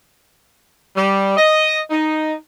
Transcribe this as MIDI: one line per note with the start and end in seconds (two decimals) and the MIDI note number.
0.97 1.36 55
1.37 1.80 75
1.90 2.34 63